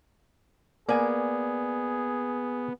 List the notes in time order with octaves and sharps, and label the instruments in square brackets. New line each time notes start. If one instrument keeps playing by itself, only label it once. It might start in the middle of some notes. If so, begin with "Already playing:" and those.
[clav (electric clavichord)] A#3 G#5 [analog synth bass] B3 [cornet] G#4 [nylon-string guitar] D5